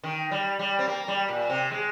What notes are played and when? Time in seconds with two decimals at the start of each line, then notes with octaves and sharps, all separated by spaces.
0.03 D#3
0.31 G3
0.59 G3
0.79 C4
0.87 A#3
1.08 G3
1.29 A#2
1.50 C3
1.71 G#3